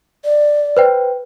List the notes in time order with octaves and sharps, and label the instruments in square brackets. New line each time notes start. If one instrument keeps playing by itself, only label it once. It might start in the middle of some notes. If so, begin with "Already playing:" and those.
[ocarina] D5
[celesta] B4 C5 G5